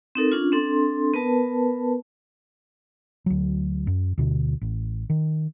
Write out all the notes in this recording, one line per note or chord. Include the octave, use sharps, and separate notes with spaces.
C4 D#4 A4 A#4
C#4 D4 F4
C4 D4 A4 C6
B3 A#4 B4 A5
D2 F#3
F#2
D2 B2 D3
A1
D#3